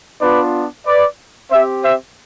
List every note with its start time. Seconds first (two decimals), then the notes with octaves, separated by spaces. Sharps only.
0.19 B3 D4 F4 B4 D5
0.85 B4 D5
1.50 C4 G4 C5 E5
1.83 C5 E5